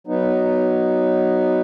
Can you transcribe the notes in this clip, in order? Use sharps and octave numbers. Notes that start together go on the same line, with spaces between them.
F#3 B3 D#4